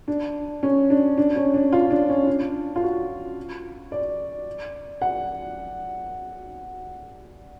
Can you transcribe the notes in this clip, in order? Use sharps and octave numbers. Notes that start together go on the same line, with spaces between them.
D4
C#4
D4
D4
C#4
D4
F4
D4
C#4
D4
F4
F#4
D5
F#5